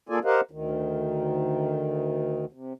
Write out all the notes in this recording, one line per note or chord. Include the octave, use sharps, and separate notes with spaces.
A#3 F4 G#4 A4 D5 G#5
G4 A#4 C5 D#5 F5 F#5
D2 D#3
C3